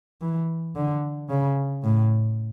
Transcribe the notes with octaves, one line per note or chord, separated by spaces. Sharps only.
E3
D3
C#3
A2